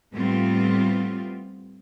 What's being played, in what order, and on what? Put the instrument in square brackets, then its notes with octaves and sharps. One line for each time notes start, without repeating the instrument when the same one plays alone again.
[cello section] A2 G3 B3 C4 F4